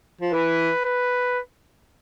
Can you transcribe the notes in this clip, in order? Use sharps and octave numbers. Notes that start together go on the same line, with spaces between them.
F3
E3 B4
B4